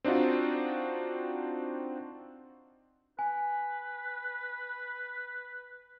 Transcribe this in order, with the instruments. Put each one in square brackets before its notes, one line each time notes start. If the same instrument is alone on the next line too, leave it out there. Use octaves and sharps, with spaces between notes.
[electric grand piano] C4 D4 D#4 F4 F#4
[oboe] B4 [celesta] G#5